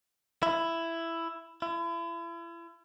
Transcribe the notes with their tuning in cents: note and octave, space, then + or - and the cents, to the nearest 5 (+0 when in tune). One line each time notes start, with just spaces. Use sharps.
E4 +10
E4 +40